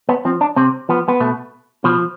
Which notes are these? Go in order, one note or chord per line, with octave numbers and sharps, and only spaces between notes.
B3
F3 C4
D4
C3 C4
F3 B3
B3
B2 A3
B2 F3